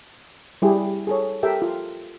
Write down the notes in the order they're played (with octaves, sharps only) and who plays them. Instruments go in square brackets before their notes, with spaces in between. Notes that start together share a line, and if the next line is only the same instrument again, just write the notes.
[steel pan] G3 E4 G4 G#4
G#4 A4 C#5
G4 A4 A#4 E5 G5
F4